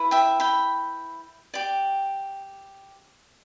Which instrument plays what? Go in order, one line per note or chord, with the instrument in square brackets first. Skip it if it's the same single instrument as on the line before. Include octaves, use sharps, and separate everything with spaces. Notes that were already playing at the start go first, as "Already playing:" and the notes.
Already playing: [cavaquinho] E4 B4
E5 G5
G5 B5
G4 D5